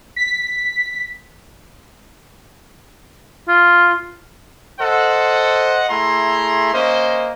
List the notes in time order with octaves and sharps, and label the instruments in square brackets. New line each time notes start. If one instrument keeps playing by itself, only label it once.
[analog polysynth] B6
[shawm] F4
[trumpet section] A4 C5 D#5 F#5
A3 E4 G#4 A#5 C6
A#3 C#4 C5 D#5